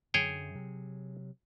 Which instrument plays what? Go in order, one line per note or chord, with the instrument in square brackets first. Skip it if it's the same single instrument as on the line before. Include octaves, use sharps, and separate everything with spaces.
[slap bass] F#2 D3 F#3 [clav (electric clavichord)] G#4 C#5 G5
[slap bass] C3 F#3